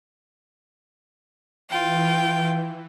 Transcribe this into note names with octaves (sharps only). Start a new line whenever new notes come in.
E3 F4 G5